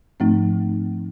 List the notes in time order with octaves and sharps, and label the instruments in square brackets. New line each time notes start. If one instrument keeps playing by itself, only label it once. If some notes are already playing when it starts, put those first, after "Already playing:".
[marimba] G#2 F3 A3 C4 D#4